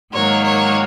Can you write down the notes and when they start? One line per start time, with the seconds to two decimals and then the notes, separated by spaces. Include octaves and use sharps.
0.12 G#2 D#3 F#3 A#3 C#5
0.42 C#5